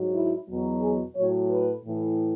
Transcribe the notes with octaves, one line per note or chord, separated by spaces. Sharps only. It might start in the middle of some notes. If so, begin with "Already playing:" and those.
Already playing: G#2 F#3
E4
E2 B2 F#3
G#4
A2 F#3 C#5
B4
A2 E3